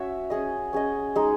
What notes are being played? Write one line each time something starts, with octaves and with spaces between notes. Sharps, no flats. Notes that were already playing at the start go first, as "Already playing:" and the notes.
Already playing: C#4 F#4 C#5 E5
C#4 G#4 D#5
C#4 G#4 D#5
G#3 D#4 G#4